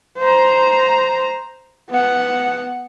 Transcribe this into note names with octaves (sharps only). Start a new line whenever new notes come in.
C5 A#5
B3 F#5